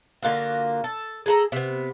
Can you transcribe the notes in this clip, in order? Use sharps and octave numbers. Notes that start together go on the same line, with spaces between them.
D3 A#3 F4 F#4
A4
G#4 A4 A#5
C3 B3